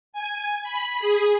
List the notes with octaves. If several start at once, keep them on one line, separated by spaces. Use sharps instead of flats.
G#5
B5
G#4